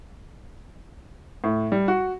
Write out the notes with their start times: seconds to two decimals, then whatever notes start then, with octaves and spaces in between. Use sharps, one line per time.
1.44 A2
1.72 G3
1.88 F#4